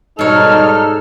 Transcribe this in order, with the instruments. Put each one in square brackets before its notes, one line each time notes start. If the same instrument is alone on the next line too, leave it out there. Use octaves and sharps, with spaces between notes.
[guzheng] G#2 C#5 [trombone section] B2 G3 D#4 [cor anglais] A4 [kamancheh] F6